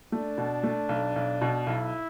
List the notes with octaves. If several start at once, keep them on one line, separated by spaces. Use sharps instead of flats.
A3 D4
B2
A3
B1
B1
B2
B1 E4